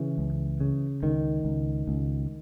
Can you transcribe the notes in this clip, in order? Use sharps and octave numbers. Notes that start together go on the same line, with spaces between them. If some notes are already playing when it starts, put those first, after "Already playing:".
Already playing: C#3 E3
C#2
C#3
C#2 D#3
C#2
C#2